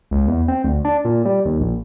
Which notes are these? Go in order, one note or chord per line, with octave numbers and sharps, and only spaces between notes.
C#2
E2
C4
D2
D4
A#2
G3
D#2
A#1